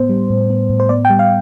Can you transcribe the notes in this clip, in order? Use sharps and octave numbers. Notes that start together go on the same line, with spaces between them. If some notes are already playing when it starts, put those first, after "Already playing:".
Already playing: A2 B3 C5
G3
A2
B3
A2
C5
B3 D5
G5
G3
F5